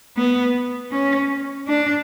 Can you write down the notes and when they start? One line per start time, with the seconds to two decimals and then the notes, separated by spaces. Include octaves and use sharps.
0.17 B3
0.92 C#4
1.68 D4